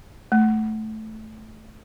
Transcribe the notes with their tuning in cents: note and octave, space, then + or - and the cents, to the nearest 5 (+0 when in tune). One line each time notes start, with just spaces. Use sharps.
A3 -10